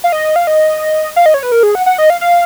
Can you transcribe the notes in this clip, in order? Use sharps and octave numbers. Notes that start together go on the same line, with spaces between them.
F5
D#5
F5
D#5
F5
D#5
C#5
B4
A#4
G#4
F#5
F#5
D#5
F5
F5